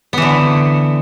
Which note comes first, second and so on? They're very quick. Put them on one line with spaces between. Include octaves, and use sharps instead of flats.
B3 E3 D3